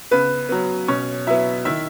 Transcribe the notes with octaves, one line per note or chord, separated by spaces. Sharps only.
C#3 B3 B4
F#3 B3
B2 C#4 C#5
F#3 B3 E4 E5
D#3 E4 E5